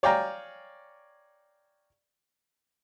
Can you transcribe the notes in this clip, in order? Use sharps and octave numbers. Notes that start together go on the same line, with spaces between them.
C#5 D5 F5 G5 G#5 A#5